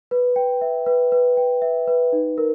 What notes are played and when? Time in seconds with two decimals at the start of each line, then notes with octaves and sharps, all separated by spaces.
0.11 B4
0.36 G5
0.61 E5
0.86 B4
1.12 B4
1.37 G5
1.62 E5
1.87 B4
2.13 D#4
2.38 A#4